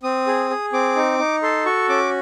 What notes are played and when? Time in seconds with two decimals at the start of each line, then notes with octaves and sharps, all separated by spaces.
0.03 C4 D#6
0.27 G#4
0.50 G#4
0.73 C4 D6
0.96 D#4
1.19 D#4
1.43 A4 C6
1.65 F#4 C#6
1.89 C#4 D6